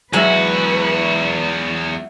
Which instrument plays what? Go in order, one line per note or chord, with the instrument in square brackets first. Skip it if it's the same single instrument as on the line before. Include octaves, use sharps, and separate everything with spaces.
[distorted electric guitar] E2 F#4 [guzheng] F#3 G#3 [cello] B4 [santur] E5 A#5